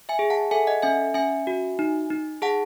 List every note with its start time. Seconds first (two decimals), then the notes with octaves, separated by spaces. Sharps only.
0.09 E5 G#5
0.19 G#4
0.30 F#5 A5
0.51 A4 E5 G#5
0.67 D#5 F#5
0.82 C#4 E5 G#5
1.14 C#4 E5 G#5
1.47 F#4
1.79 D#4
2.10 D#4
2.42 G#4 F#5 A5